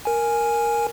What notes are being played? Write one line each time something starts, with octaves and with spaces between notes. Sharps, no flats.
A#4 G#5